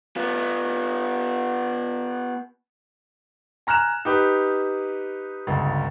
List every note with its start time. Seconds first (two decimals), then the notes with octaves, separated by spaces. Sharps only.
0.16 B3 F4
3.67 G#5 A#5 F6 F#6 E7
4.05 D#4 G4 B4
5.47 G1 C#2